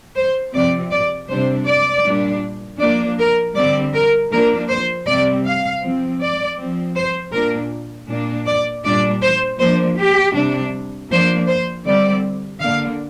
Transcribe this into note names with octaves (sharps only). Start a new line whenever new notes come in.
C5
C3 F3 C4 D5
D5
C3 G3 D4 C5
D5
A#2 G3 D4
F3 A#3 D4 D5
A#4
D3 G3 C4 D5
A#4
F3 A#3 D4 A#4
C5
C3 G3 C4 D5
F5
F3 C4
D5
F3 C4
C5
A#2 A#3 D4 A#4
A#2 A#3 D4
D5
A#2 G3 D4 D5
C5
F3 A#3 D4 C5
G4
C3 G3 D4
F3 A#3 D4 C5
C5
D3 G3 C4 D5
D3 A#3 D4 F5